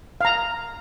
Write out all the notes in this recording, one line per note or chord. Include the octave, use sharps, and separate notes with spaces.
F5 A#5